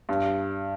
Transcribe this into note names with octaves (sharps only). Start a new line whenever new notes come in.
G2